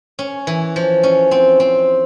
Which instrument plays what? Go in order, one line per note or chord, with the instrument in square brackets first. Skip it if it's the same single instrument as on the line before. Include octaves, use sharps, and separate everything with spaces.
[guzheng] C#4
E3
F3
C#4
C4
C4